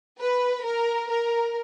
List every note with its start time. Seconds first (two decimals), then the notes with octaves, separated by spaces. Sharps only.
0.20 B4
0.64 A#4
1.10 A#4